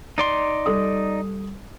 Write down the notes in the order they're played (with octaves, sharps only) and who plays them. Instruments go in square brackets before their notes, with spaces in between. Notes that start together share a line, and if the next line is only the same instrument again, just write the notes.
[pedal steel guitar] D#4 D5 C6
[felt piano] G3 A4 D#6